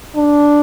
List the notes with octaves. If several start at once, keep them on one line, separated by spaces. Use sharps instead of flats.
D4